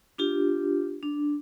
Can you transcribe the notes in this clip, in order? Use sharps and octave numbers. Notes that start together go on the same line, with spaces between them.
D4 F4 G4
D4